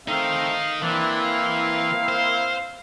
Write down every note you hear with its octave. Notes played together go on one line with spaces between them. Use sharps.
A3 C4 D#4 A#4 F5
E3 A#3 C4 D4 E4
F5
C5